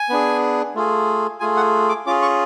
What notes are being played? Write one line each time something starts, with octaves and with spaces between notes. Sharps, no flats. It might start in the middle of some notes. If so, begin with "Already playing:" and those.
Already playing: G#5
B3 D4 G#4
A3 F4 G#4
A3 F4 G#4 G#5
F#5
D6
C#4 F4 G#4 D6
C#6